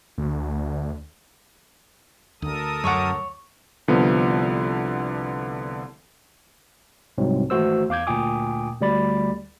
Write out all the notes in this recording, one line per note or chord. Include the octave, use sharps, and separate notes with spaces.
D2
D2 A4 A#4 D#6
F#2 C#5 F#5 C#6 D6
C2 D3 F3 B3
C2 G#2 F#3 C4
G#1 E3 A3 F#4 C5 E6
E2 F5 D6 G6 G#6
D2 A#2 G5 G#5 D6 D#6
D2 G3 D5 B5 A6